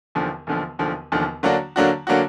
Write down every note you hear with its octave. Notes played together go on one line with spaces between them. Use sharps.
E1 D#2 D3 F3
E1 D#2 D3 F3
E1 D#2 D3 F3
E1 D#2 D3 F3
D3 F#3 A#3 D4 F#4
D3 F#3 A#3 D4 F#4
D3 F#3 A#3 D4 F#4